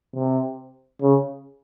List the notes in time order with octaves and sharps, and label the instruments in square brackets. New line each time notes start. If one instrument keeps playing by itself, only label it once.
[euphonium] C3
C#3